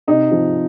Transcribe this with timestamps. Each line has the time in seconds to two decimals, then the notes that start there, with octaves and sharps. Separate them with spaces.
0.07 C3 D#4
0.31 F3